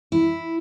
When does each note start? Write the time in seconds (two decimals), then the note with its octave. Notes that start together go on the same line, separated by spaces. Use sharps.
0.12 E4